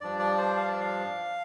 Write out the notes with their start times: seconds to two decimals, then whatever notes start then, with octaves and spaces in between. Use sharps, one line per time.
0.01 G2 F3 D4 D5
0.19 D5
0.38 C5
0.56 F5
0.68 D5
0.80 F5